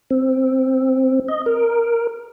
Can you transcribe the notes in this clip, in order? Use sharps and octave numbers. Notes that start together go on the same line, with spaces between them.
C4
D#5
A#4